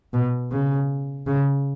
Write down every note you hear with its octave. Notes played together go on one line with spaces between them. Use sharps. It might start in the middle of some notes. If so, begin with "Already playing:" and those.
B2
C#3
C#3